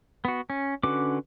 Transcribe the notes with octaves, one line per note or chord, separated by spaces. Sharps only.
B3 F#4
C#4
D3 C#4 F#4 B4 D6